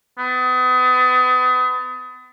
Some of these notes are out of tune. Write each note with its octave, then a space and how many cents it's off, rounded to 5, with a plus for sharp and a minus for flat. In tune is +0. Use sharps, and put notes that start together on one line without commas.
B3 +35